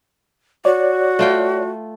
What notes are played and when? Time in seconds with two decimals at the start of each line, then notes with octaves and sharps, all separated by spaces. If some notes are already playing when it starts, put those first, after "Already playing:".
0.65 F#4 C#5 D5
1.19 A3 F4 G5